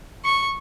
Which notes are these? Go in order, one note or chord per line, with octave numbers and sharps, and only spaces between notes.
C#6